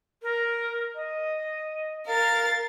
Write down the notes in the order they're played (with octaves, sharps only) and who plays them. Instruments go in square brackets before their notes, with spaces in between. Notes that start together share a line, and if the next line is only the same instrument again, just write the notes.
[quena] A#4
D#5
[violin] A#4 A6 [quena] F5